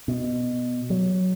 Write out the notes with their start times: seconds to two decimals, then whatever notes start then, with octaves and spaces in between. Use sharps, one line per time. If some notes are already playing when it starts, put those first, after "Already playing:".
0.08 B2
0.90 F#3